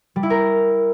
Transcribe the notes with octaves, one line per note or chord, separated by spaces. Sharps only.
G3
E4
A#4